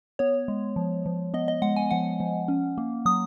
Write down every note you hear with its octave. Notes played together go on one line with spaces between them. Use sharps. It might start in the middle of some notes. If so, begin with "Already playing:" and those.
B3 C#5
G#3
F3
F3
B3 D#5
D#5
G#3 F#5
G#5
F3 F#5
F3
C#4
A#3
F#3 D#6